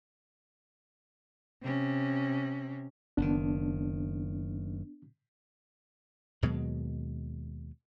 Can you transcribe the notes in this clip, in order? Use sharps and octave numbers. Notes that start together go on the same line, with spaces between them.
C3 C#4
F#1 D#3 B3 D4
D#2 B2 F#3 G#3